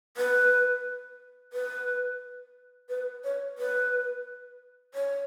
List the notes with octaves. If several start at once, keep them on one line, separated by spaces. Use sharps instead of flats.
B4
B4
B4
C#5
B4
C#5